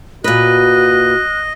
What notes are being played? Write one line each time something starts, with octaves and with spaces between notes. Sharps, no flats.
A#2 F#4 B4 D#5 F#6